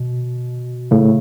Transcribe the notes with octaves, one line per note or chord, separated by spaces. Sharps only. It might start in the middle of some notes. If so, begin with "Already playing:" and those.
Already playing: B2
A2 C#3